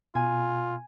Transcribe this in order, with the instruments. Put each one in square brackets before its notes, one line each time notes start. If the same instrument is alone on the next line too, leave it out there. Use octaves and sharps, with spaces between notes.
[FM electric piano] B2 [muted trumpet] F4 [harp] G#5